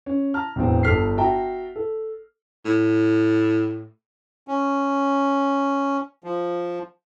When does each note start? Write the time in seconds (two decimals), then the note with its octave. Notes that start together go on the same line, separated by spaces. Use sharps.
0.06 C#4
0.34 A5 A#5 F6
0.56 E1 E2 A2 E3 C4
0.83 G1 G2 A4 F6 B6 C7
1.18 F#4 E5 G5 A5 A#5
1.76 A4
2.65 A2
4.48 C#4
6.24 F3